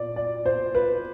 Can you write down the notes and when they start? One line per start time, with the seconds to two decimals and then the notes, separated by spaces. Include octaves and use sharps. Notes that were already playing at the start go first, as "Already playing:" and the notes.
Already playing: A#2 D5
0.16 D5
0.46 C5
0.75 B4